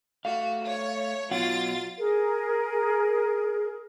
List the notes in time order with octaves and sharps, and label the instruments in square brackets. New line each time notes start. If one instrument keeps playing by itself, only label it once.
[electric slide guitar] A3 F5 [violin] F#4
[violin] C#5
[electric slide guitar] B2 F#3 F#5 [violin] F4 A6
[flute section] G#4 A#4